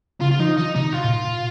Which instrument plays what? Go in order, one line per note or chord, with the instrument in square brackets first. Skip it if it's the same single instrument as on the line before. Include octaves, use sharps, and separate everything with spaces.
[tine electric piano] C#3 [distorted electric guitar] F4
[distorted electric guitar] F4
[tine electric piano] F3 [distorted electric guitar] D#4
[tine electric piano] D#3 [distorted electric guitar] D#4
[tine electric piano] C3 [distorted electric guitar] D#4
[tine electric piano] C3 [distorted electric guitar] F4
[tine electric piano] A#2
A#2